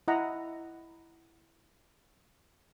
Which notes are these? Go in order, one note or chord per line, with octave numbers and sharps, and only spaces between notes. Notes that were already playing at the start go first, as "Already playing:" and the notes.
E4 D#5 F#5 A#5